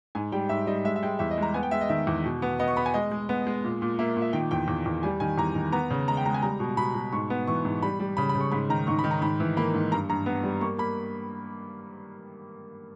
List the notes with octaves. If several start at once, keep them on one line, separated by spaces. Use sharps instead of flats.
G#2 G#5
G3 G5
G#2 E5
G3 D#5
G#3 E5
E5
G#3 G5
E2 E5
D#5
G#3 A#5
B3 G#5
G5
G#3 E5
D#5
D#3 E5
E2
B2
B3
B3 D#5
C#6
B3 B5
G#5
G#3 D#5
G#3
B3
G#3
A#2
A#2
A#3 E5
A#2
E5
D#3 G5
E2 G5
E2
E2
G3 G#5
D#3 G#5
E2 A#5
D#3
B3 A#5
C#3
G#3 A#5
G5
G#3 A#5
G#5
G3 A#5
B2
B2 B5
B2
G#2 C#6
B3
E3 C#6
G#2
G3 B5
G3
C#3 B5
B5
C#3
C#6
G#2 B5
D#3 A#5
G#2 C#6
B5
D#3
A#5
G#2 B5
E3
A#3 B5
G#2
G2 A#5
G2 A#5
B3
G3
A#3 C#6
A#3 B5